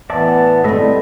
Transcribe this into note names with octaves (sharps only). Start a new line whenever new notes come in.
A2 E3 B3 D5 E5 A5
A2 D3 G3 A3 C4 B4 D#5 E5